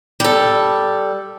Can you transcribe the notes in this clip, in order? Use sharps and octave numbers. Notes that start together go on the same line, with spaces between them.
G3 A4